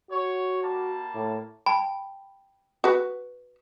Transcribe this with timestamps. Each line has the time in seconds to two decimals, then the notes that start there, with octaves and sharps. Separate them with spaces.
0.10 F#4 C#5
0.62 G3 A#3 A5
1.15 A2
1.66 G5 A5 B5
2.84 F#4 B4